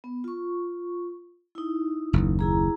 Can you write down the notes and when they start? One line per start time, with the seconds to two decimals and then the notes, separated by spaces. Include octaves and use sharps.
0.04 B3
0.24 F4 C#6
1.55 D#4 E4
2.13 F#1 D#2
2.39 E4 G#4 A#5